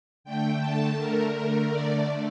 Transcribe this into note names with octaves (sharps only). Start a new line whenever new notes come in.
D3 A3 G5
A5
A#4
D5